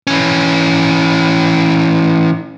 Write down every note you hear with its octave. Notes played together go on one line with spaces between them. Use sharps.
E3 C#4